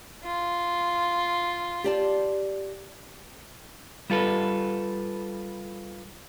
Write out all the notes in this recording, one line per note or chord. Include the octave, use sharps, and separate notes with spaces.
F4
G4 D5 A5
G3 F4 A4 B4